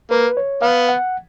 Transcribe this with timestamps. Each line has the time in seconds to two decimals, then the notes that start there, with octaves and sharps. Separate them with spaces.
0.11 A#3 B4
0.37 C#5
0.62 B3 F5
0.89 F#5